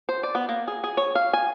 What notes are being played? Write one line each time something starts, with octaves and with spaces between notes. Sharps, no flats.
C5
D5
B3
A#3
G#4
G#4
C#5
F5
G#5